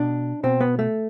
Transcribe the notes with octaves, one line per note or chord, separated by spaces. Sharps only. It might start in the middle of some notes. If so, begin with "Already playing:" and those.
Already playing: B2 D4
B2 C4
B3
A3